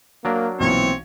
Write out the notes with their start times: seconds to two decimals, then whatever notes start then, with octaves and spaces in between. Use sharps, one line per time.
0.25 F#3 A#3 D4 A#4
0.60 B1 A#2 E3 C4 C#5